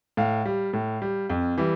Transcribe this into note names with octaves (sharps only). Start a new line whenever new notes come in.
A2 F5
G3
A2
G3
F2
E3 G3